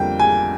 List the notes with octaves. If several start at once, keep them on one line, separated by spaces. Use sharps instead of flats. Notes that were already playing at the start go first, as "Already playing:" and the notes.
Already playing: F2 D3 G3 A#3 G5
G#5